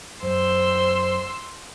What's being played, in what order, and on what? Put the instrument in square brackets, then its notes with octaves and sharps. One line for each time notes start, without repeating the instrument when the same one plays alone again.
[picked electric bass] F#2 [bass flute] C5 [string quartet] C6 E6